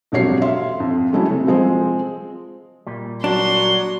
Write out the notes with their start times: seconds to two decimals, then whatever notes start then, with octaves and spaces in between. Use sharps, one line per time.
0.12 E1 F2 F#3 G4 C#5 C7
0.42 E5 F5 C6
0.80 F2
1.12 F#3 G#3 A3 C#4 E4
1.29 C3
1.47 F3 G#3 C4 C6
2.87 A#2 G3
3.24 F#3 D4 C6